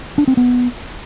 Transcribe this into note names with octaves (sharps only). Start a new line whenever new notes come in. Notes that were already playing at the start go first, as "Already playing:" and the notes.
D4
C4
B3